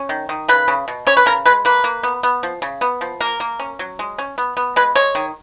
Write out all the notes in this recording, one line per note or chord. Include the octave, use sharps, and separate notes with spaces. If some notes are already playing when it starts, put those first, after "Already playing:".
Already playing: C#4
D#3
D#3
C#3 B4
C#3
B2
C#4 C#5
B4
C#3 A#4
G#3 B4
A#3 B4
A#3
B3
B3
F3
C#3
B3
F3
A#3 A#4
A#3
C#4
F#3
G#3
C#4
B3
B3
G#3 B4
G#3 C#5
D#3